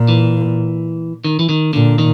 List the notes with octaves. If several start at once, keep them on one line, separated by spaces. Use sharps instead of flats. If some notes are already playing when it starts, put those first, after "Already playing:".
Already playing: A#2
E3
D#3
E3
D#3
A#2 D3
D#3